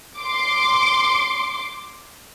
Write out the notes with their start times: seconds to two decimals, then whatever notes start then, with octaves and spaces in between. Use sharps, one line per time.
0.17 C6 D6